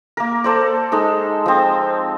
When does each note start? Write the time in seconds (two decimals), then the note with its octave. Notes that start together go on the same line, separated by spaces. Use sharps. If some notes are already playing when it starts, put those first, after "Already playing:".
0.17 A#3 A#4
0.44 A4 C5 D5
0.92 G#3 D#4 A4
1.46 F3 C4